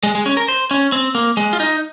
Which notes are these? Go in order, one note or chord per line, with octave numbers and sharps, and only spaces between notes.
G#3
G#3
C#4
A#4
C5
C#4
C4
A#3
G#3
F4
D#4